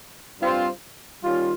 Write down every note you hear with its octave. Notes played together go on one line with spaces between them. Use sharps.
G2 G3 C4 F4 C5
D#3 G3 C#4 F4